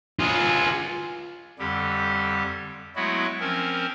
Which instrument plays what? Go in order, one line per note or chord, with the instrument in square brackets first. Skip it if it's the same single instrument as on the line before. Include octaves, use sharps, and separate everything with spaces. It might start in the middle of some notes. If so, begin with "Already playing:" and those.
[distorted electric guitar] F4 G#4
[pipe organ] F2 D3 G3 G4
F#3 G#3 A3 B3 E4 F#4
F3 C4 C#4 A#4